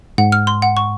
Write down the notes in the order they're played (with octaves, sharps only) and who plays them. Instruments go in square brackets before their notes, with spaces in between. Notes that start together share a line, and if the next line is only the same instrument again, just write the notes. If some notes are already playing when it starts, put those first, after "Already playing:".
[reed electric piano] G#2 [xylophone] F#5
[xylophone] F6
C6
F#5
C#6